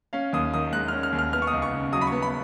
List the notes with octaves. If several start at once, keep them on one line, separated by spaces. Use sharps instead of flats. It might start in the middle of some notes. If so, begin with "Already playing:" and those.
C#4 F5
D#2 D#6
D#3 D#6
G#3 F#6
C#4 F6
F6
D#2
F6
B3 F6
C#6
D#6
C#2
C#6
C#3
F#3 D#6
B5
C#6
B3
B5